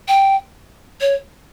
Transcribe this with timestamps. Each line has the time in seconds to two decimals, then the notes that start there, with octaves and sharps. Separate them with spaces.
0.08 G5
1.01 C#5